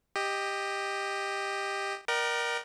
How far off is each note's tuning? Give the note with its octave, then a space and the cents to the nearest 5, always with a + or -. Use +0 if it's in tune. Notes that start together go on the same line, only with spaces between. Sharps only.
G4 +10 D#5 +0
A#4 +20 D5 +40 G5 -40